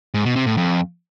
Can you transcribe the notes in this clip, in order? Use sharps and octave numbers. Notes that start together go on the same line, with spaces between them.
G#2
B2
C3
A2
F2